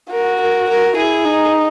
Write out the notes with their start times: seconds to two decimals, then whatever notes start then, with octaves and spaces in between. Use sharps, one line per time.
0.11 F#4 A#4
0.40 A#4
0.69 A#4
0.96 E4 G#4
1.25 D#4